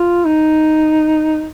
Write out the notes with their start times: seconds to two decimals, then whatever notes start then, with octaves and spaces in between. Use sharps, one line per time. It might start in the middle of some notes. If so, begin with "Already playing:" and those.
Already playing: F4
0.25 D#4